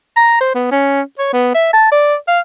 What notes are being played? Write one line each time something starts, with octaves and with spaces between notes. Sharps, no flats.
A#5
C5
B3
C#4
C#5
B3
E5
A5
D5
F5